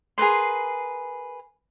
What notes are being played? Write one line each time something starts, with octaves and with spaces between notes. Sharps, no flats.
G#4 A#4 B4 C6